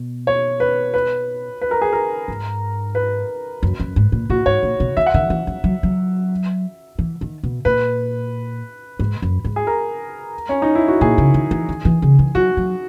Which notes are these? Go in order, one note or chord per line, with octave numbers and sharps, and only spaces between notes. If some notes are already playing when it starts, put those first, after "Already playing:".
Already playing: B2
C#5
B4
B4
B4
A#4
G#4
A#4
G#2
B4
F#2
F#2
G#2
A#2
A#2 F#4
G#2 C#5
A#2
B2
D#3 E5
F#5
D#3 E5
E3
F#3
F#3
F#3
E3
D#3
B2
A#2 B4
G#2
F#2
G#2
G#4
A#4
C#4
D#4
E4
F#4
A#2 G#4
C#3
D#3
E3
D#3
E3
C#3
E3
F#3 F#4
F#3